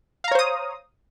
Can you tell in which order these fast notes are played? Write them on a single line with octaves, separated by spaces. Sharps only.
F5 A#5 C#5 C5 D#6